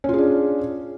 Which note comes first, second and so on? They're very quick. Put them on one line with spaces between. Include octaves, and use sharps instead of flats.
C#4 F4 G#4 D4